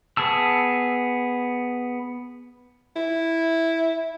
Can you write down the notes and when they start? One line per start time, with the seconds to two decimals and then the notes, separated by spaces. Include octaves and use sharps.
0.17 B3 G#4 A5 E6
2.96 E4